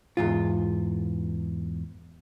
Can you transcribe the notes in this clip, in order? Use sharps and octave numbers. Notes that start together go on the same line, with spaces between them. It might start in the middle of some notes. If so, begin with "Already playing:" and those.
E2 G#2 F4